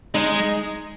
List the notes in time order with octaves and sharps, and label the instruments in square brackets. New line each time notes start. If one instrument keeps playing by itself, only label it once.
[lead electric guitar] G#3 [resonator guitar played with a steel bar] D#4